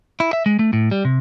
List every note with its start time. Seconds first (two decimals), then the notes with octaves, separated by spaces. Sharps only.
0.20 E4
0.33 E5
0.46 G#3
0.59 A3
0.73 A2
0.91 G3
1.05 C3